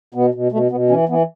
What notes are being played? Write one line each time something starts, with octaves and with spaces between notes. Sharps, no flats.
B2 B3
B2
B2 A3
B2 B3
E3 C#4
E3 B3